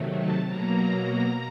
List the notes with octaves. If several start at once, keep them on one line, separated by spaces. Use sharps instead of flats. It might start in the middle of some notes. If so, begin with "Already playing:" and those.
Already playing: C3 D#3 F#3 A3
A5
B2 F#3 A#3 A#5